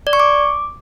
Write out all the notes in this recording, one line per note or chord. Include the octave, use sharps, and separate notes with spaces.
D5
C#6
D6